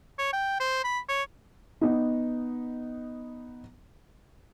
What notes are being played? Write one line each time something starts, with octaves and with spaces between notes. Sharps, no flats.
C#5
G5
C5
B5
C#5
B3 D#4